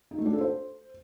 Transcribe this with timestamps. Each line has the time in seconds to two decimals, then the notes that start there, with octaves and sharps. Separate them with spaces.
0.11 D#4
0.18 A3
0.26 D4
0.33 A4
0.41 C5